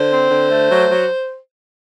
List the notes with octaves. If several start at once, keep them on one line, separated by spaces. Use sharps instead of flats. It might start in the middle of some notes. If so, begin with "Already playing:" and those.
Already playing: D3 C5
C4
D3
A3
F#3
F#3